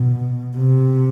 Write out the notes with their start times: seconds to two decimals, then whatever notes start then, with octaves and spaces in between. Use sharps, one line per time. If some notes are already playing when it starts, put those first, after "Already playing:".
Already playing: B2
0.57 C3